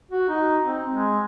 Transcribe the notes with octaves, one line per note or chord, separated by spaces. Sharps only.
F#4
D#4
C4
G#3